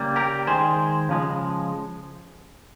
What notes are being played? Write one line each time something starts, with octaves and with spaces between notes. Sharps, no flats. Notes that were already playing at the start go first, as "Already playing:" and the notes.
Already playing: C#3 G3 A#3
G4 A#4
D#3 G#3 G#4 C5
C#3 F3 G#3